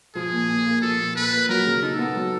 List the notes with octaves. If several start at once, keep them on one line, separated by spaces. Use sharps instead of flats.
F3 G#4
A#2
A#2
A#3
F3 A4
A#2
A#2 B4
A#3
F#3 A#4
C#3
D#4 A4
B3
F#3